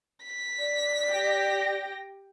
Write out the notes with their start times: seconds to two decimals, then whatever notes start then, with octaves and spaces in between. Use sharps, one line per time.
0.24 B6
0.59 D5
1.10 G4 G5 A#6